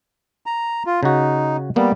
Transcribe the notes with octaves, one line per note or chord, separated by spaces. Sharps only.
A#5
F4
C#3 D#4 F#4
G3 A#3 B3